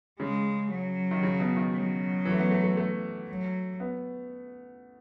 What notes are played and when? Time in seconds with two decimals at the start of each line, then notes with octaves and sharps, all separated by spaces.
0.20 C#3 G#3
0.71 F#3
1.11 D#3
1.23 C#3
1.40 B2
1.56 D#3
1.73 F#3
2.25 E3
2.31 A3
2.38 B3
2.51 A3
2.64 A3
2.77 A3
3.29 F#3
3.80 B3